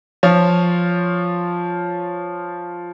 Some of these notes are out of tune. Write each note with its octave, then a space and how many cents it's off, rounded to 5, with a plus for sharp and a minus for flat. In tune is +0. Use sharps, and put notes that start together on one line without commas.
F3 +0 F4 +0 C#5 +0